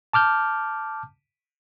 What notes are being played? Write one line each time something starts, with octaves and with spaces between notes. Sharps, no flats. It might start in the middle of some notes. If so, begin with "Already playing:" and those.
A5 D6 F6 G6